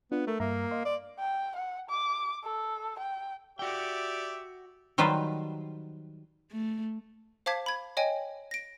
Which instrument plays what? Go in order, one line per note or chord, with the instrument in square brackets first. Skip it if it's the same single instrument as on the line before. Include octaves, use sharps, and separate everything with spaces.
[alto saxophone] B3 [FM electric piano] D4 F4
[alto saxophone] A3 [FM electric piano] A#4
[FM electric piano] G2 E5 A#5 [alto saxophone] A#3
[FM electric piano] D#5 F5 C6
[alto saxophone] D5
[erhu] G5
F#5
D6
A4
G5
[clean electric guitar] F#4 G5 [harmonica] G4 D5 E5
[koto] D#3 F#3 G3 F4 B4 C5
[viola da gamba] A3
[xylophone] C5 F5 A5 D6 G#6 B6
B5 G#6
C#5 D#5 G5 G#5
A#6 D7